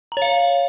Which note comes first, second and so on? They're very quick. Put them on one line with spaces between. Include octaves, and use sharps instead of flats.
A#5 C#5 F5